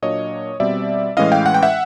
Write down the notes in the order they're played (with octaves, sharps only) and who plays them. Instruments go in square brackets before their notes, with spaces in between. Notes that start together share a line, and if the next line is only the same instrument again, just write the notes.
[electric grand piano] A#2 F#3 A#3 D4 C#5 D#5
B2 G3 C4 D5 E5
A2 E3 G#3 C#4 E4 D#5 F5
F5 G5
F#5
G5
E5 F#5